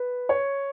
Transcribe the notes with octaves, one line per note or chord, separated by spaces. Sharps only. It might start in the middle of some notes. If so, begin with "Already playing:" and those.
Already playing: B4
C#5